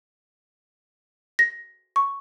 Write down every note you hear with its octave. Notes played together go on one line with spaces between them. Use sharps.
A#6
C#6